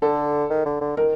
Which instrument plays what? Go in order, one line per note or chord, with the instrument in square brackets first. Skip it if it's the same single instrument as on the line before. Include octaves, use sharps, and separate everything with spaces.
[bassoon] D3 [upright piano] A4
[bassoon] D#3
D3
D3
[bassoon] D#3 [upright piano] A#4